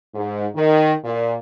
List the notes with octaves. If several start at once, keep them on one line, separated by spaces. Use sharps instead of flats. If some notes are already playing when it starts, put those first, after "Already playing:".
G#2
D#3
A#2